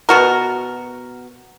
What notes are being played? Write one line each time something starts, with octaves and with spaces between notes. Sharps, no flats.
B2 F#4 A#4